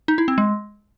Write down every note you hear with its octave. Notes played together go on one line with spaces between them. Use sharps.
D#4
E4
C4
G#3